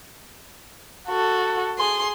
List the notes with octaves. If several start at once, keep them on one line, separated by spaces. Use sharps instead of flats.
F#4 A4
G#4 C6